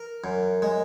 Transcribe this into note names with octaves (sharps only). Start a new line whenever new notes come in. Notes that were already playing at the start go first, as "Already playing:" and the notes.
Already playing: A#4
F#2
G#3